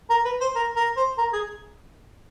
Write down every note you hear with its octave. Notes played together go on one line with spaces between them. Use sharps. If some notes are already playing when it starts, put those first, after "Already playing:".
A#4
B4
C5
A#4
A#4
C5
A#4
G#4